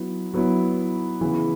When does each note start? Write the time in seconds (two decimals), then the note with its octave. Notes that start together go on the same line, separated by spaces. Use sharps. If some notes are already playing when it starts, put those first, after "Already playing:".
Already playing: F#3 B3 E4
0.33 F#3 B3 E4
1.21 C#3 E3 B3 E4